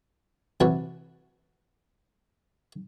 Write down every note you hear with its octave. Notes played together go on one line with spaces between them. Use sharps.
C3 E3 F#4 B4 C#5 A5